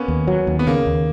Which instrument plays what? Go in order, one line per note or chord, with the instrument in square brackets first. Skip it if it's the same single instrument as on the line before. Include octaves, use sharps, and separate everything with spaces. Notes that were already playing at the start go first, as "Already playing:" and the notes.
Already playing: [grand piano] A#3 B3 C#4
[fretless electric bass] D#2
F#3
D#2
[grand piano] B3
[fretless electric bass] C#3 [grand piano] A#3
[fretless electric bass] D#2